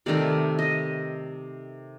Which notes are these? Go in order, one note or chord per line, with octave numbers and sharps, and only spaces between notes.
C3 D#3 A3 D5
D#5